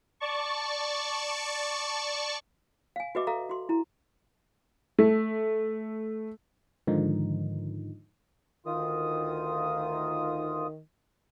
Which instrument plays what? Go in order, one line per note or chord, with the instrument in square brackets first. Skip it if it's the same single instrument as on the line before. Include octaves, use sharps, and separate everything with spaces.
[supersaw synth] D5 A5 C#6
[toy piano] F5 G#5
F#4 G4 B4 D#5 E5 D6
A4 E5 F5 A#5
F#4 C6
E4 A#5
[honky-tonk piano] A3
[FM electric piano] G#2 D3 D#3 F3 D#4
[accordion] D2 F4 D#6 [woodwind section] D#3